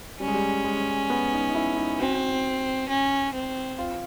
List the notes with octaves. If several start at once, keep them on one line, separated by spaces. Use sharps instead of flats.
G3 C#4
G#3
G3
G#3
B3
D#4
D#4
E4
D#4
C4 F#4
C#4
C4
F4